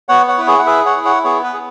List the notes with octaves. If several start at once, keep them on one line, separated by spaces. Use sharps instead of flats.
B3 C#5 F#5
C#5 F#5
E4 B4
G#4 C#5
F#5
G#4 B4 E5
C#5 F#5
E4
C#5 F#5
B3 G#4 C#5
B4
G#4